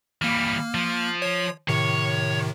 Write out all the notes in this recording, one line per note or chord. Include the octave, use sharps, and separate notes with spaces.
E3 G3 A#3 F6
F3
C#5
A2 C3 D#3 C#5